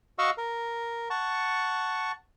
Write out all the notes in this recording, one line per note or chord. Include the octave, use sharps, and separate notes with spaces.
F#4 D#5 F5 F#5 C#6 E6
A#4
F#5 A5 C#6